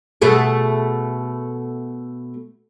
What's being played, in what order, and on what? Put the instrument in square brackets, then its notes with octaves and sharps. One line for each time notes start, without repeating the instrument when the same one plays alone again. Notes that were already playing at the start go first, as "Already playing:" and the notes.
[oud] B2 A3 G#4